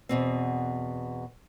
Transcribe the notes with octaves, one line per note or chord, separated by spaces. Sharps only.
E2 B2 C4